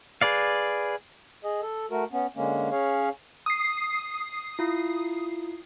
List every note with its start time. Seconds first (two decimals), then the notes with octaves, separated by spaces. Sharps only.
0.22 G#4 B4 D5 F5
1.44 G#4 D#5
1.62 A4
1.91 A3 F#4 A#4
2.12 B3 C#4
2.36 D3 G#3 A#3 C#4
2.72 C#4 G#4 C#5 F5
3.46 D#6 C7
4.59 E4 F4